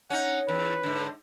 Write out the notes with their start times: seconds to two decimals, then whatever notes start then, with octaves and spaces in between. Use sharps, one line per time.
0.10 C#4 D#4 F#5
0.48 E2 B4
0.83 G#2 D3